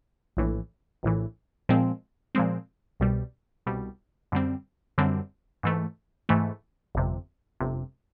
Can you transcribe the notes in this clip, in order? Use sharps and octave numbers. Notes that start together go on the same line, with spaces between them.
A#1 A2 E3
A#1 A2 E3
A#2 F3 G#3 C4
A#2 F3 G#3 C4
C2 B2 G3
C2 B2 G3
F#2 D3 G3 C4
F#2 D3 G3 C4
G#2 E3 A3
G#2 E3 A3
G1 F2 C3
G1 F2 C3